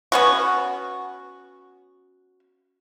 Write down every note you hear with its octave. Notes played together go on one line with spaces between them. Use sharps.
B3 C#4 F#4